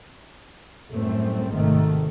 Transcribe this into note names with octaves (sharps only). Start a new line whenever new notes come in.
F#2 A2 G3 A3 C4
G#1 G#2 C3 D#3 A3